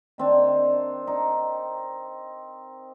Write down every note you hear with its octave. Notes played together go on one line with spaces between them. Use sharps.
D#3 C4 D4
D#4